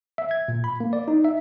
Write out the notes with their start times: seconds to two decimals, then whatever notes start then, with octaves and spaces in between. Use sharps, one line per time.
0.18 E5
0.31 G#6
0.48 A#2
0.64 B5
0.80 A#3
0.93 D5
1.08 D#4
1.24 E5